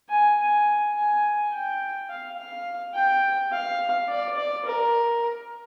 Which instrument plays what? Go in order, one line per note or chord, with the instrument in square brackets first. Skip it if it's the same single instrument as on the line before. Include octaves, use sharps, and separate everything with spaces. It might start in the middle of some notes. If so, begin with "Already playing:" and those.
[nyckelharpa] G#5
G#5
G#5
G5
F5
F5
G5
F5
D5
D5
A#4